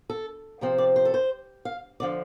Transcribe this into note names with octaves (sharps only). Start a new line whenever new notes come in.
A4
C3 F3 C4
D5
C5
A4
C5
F5
D3 F3 D5